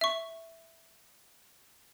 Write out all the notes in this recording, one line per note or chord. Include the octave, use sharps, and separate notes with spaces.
E5 C#6